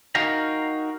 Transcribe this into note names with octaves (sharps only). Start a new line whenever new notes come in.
D#4 F#4 A#4 F5 G5 A#5